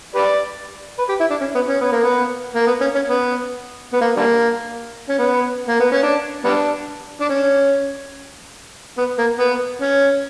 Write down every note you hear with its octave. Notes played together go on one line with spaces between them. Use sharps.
G4 B4 D5
B4
G4
E4
D4
C#4
B3
C#4
B3
A#3
B3
A#3
B3
C#4
C#4
B3
B3
A#3
D3 G3 A#3
C#4
B3
A#3
B3
C#4
D4
G3 B3 D4
D4
C#4
B3
A#3
B3
C#4